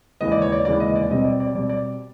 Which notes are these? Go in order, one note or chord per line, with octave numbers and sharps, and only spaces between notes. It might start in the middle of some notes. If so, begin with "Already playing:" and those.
D#2 C#3 E3 G#3 B3 D#5
D5
C#5
D5
D#2 C#3 E3 G#3 B3 D5
D#5
D5
B2 G3 C4 D#5
D5
D5
B2 G3 C4 D5
D5